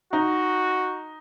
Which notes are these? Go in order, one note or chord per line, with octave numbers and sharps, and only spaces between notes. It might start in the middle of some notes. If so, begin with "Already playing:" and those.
D#4 F#4